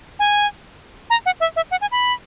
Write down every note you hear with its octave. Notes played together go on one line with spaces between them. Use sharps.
G#5
A#5
F#5
E5
E5
F#5
G#5
B5